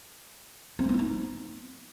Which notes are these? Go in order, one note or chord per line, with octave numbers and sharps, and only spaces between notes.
C4
A3
B3
E4
D#4